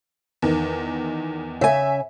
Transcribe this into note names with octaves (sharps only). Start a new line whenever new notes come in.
E2 D#3
C#3 E5 G#5